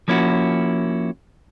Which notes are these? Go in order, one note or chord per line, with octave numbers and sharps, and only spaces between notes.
F3 A#3 C#4 E4 F#4